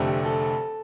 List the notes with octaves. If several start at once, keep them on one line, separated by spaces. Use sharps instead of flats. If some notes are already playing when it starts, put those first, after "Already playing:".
Already playing: F1 F2 D3 A3 G4
A4